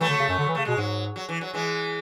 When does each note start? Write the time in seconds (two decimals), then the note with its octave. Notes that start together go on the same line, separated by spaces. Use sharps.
0.01 E3 F#3 A3
0.10 D3
0.20 C#3
0.29 F#2
0.39 D3
0.48 E3
0.55 C#3 A3
0.65 B2 G#3
0.77 G#2 F#3
1.16 F#3
1.29 E3
1.41 F#3
1.53 E3 G#3